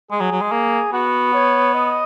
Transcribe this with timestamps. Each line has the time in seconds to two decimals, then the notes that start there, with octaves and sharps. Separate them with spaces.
0.11 G#3 G#4
0.21 F#3
0.32 F#3
0.41 G#3
0.52 A#3
0.93 B3 F#4
1.33 C#5
1.74 D#5